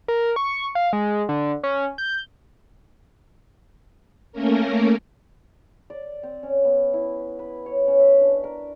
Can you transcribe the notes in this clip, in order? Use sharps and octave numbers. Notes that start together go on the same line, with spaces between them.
A#4
C#6
F5
G#3
D3
C#4
G6
A3 A#3 C#4 A#4
D5
C4
C#4
B3
E4
B4
C#5
C#4
E5
D4
A#4